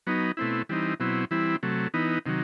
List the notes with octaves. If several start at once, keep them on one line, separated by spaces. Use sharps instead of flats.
F#3 B3 D#4
B2 A3 C4 E4
E3 G3 C4 D#4
B2 F#3 C4 E4
E3 G3 C4 E4
C3 F#3 A3
E3 B3 D#4
C3 D#3 F#3